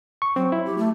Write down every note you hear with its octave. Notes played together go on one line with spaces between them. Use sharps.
C#6
F#3 C4
E4
G4
A3